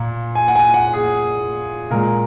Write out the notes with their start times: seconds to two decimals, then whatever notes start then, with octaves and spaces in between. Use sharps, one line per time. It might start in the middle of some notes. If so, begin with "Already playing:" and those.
Already playing: A#2
0.35 G#5
0.48 F#5
0.56 G#5
0.74 F#5
0.93 G#4
1.90 A#2 G#3 A#4